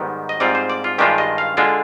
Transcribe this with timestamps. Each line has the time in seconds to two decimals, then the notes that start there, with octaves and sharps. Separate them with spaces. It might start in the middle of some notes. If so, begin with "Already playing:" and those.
Already playing: G#2 D#3 G3 B3
0.29 D#5
0.40 G#2 G3 C4 F4 D5
0.55 C5
0.70 D5
0.84 F4
0.98 G2 D#3 G#3 D4 F4 G4
1.18 D#5
1.38 F5
1.57 D3 G#3 D4 F4